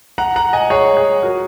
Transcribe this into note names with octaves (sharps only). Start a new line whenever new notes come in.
F#5 A#5
F#5 A#5
D#5 G#5
G#4 C#5
G#4
F#4 A#4